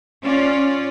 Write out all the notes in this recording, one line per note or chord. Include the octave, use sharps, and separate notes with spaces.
C#4 F4 D5